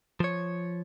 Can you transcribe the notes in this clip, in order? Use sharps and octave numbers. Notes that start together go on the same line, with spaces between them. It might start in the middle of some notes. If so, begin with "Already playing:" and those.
F3 C#5